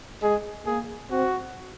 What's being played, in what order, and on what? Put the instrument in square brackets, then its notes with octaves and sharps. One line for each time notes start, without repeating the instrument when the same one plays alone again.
[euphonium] G#3 [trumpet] G#4
[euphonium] A#3 [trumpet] G#4
[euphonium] C4 [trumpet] F#4